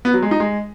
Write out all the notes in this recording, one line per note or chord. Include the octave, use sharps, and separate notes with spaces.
B3
F#3
G#3
D#4
G#3